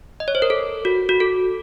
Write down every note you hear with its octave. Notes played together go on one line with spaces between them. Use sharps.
D#5
C#5
C5
A#4
A4
F#4
F#4
A4